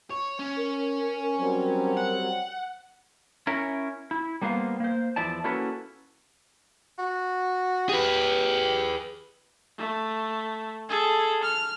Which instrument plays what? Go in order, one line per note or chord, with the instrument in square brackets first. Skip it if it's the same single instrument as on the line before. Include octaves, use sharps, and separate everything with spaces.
[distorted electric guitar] C#5
C#4
[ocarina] A#4
[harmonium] F#3 G3 C4
[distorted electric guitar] F#5
[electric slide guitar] C#4 E4 A#4
E4
G3 A#3 B3 C5 F5
A#3 C5
E2 F3 E4 D5 A5
A#3 C#4 E4 F#4 A4 B4
[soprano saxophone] F#4
[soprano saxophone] G4 [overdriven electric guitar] G#4 B4
[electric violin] A3
G#4 A4
F6